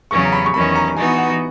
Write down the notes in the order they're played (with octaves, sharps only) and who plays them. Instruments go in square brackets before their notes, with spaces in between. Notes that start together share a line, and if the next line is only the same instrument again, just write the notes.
[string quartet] E2 C#3 F#3 C#4 [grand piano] C#6
[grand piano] A#5
B5
C#6
[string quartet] E2 D#3 F#3 C#4 [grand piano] B5
[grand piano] A#5
[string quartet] E3 B3 D#4 F#4 [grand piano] G#5
[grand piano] F#5